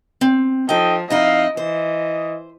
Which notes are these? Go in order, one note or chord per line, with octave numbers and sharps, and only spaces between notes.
C4
F3 D#4 A4 D#5 G5
F2 D#4 E4 D#5 F5
E3 C5 D#5